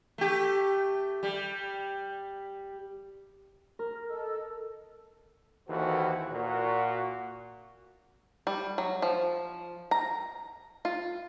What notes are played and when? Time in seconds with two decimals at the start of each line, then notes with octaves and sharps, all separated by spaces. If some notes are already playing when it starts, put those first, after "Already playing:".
0.18 A3 G4
1.23 G3
3.79 A#4
3.94 F6
4.08 A4 D#5 E6
5.68 D#2 E3 F#4 A4 B4 C5
6.31 A#2 F#4
8.47 G3
8.78 F#3
9.02 F3
9.91 A#5
10.85 F4